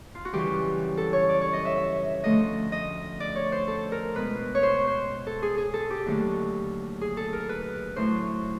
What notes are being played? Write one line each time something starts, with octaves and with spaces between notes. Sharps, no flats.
F4
F#4
F#2 C#3 E3 G3 G4
A4
C#5
D5
C#5
D#5
E5
E5
D2 D3 F3 A3 D#5
D#5
D5
C#5
C5
A4
A#4
B2 G#3 B4
C#5
C5
C5
A4
G#4
G#4
A4
G4
D#2 D3 F#3 A3
G#4
A4
A#4
B4
A2 F#3 A3 C5